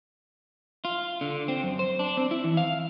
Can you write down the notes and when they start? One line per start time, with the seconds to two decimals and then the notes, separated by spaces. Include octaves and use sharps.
0.85 F4
1.21 D3
1.48 C4
1.63 F#2
1.79 C5
1.99 D4
2.17 C4
2.31 E4
2.44 E3
2.57 F5